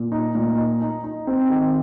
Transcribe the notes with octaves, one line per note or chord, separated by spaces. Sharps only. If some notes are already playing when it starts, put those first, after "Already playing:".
Already playing: A#2
D#4
A#2
D#4
D#4
D#4
C4
D#3